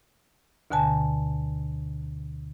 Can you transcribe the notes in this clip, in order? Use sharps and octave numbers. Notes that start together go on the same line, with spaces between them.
D2 B2 D3 G#5 A5